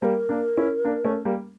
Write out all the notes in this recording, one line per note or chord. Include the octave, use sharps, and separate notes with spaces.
G3 A#3 A#4 C5
A#3 D4
C#4 E4
A#3 D4
A3 C#4
G3 A#3